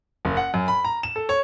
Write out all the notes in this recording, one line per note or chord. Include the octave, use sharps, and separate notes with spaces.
F#1
F#5
F#2
B5
A#5
E7
A4
C#5